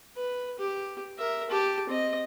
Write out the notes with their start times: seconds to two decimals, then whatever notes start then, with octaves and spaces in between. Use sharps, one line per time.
0.16 B4
0.59 G4
1.18 A#4 E5
1.49 G4 A5
1.89 C4 D#5